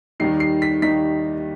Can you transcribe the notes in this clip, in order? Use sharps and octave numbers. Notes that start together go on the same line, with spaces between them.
D#2 D#3 G3 D#4 C7
C7
B6
D#2 D#3 G3 D#4 B6